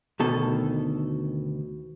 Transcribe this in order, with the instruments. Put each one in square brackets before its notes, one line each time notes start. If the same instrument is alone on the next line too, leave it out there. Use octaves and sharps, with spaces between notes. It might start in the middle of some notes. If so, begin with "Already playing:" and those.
[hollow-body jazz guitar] D2 B2 D#3 A4